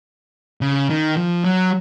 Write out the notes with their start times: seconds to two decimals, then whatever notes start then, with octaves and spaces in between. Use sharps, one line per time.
0.61 C#3
0.90 D#3
1.17 F3
1.44 F#3